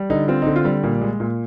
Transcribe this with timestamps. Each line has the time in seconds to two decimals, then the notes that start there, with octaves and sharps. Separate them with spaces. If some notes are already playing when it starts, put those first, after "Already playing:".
Already playing: G3
0.10 D3 D#4
0.28 C4 F4
0.42 D3 D#4
0.56 F4
0.65 G3
0.83 A#2
1.01 G#3
1.20 A#2